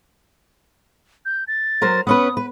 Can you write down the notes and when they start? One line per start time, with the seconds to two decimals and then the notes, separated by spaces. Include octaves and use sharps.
1.25 G6
1.48 A6
1.82 F#3 A#4 C5
2.07 B3 C#4 B4 D#6
2.37 B4